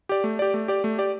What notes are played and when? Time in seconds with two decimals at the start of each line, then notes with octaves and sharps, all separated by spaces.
0.09 G4 D5
0.24 A3
0.39 G4 D5
0.54 A3
0.68 G4 D5
0.84 A3
0.98 G4 D5